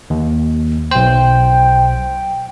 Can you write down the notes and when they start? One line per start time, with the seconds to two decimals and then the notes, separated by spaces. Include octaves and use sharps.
0.10 D#2
0.91 B1 C5 G5